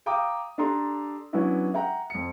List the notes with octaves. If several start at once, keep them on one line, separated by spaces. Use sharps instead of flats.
F5 G5 A#5 D6 D#6
D4 G4 A4 A#5 C6
F#3 B3 C#4 D4 E4 F#4
E5 F#5 G5 A#5
F2 C#7